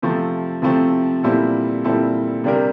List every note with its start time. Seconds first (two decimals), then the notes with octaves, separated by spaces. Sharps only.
0.02 C3 F3 A3 C4
0.62 C3 F3 A3 C4
1.23 A#2 G3 C4 E4 A4
1.84 A#2 G3 C4 E4 A4
2.44 C3 G3 D4 G4 A#4